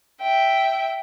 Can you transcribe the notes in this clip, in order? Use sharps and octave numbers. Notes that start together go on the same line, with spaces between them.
E5 G5